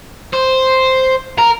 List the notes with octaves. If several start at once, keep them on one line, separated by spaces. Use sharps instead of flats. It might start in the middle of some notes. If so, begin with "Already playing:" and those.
C5
A#4